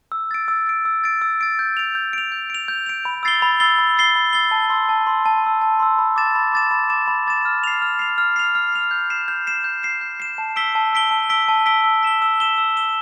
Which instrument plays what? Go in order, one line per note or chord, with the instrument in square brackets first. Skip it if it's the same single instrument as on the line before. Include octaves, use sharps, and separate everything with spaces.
[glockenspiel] E6
A6 D7
E6
A6 D7
E6
A6 D7
E6
A6 D7
G6
D7 F7
G6
D7 F7
G6
D7 F7
G6
D7 F7
B5
E6 A6 C7 G7
B5
E6 A6 C7 G7
B5
E6 A6 C7 G7
B5
E6 A6 C7 G7
A5
C6 E6
A5
C6 E6
A5
C6 E6
A5
C6 E6
B5
D6 A6 E7
B5
D6 A6 E7
B5
D6 A6 E7
B5
D6 A6 E7
F6
C7 F7
F6
C7 F7
F6
C7 F7
F6
C7 F7
G6
C7 E7
G6
C7 E7
G6
C7 E7
G6
C7 E7
A5
E6 B6 D7 G7
A5
E6 B6 D7 G7
A5
E6 B6 D7 G7
A5
E6 B6 D7 G7
E6
B6 E7 G7
E6
B6 E7 G7
E6
B6 E7 G7